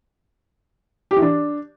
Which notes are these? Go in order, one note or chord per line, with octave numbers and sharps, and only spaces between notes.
G4
E3
D4